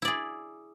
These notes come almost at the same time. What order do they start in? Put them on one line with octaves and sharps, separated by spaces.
E4 D5 G#4